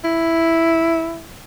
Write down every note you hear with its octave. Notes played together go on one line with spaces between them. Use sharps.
E4